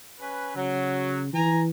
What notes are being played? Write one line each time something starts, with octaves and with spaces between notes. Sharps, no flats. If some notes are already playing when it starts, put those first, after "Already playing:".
C#4 B4
C#3 F#3
E3 G#5 A#5